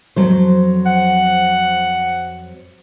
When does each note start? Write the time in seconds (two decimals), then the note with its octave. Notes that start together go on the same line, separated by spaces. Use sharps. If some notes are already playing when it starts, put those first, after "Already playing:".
0.16 F2 F#3 C5
0.86 F#5